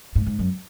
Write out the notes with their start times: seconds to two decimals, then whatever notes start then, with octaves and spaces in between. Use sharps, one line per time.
0.16 G#2
0.26 G#2
0.39 F#2